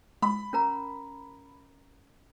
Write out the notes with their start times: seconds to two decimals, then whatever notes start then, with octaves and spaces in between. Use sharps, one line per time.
0.22 G#3 B5
0.53 C#4 A#4 A#5